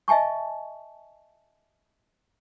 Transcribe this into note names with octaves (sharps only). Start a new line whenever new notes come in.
D#5 E5 G#5 A5 C#6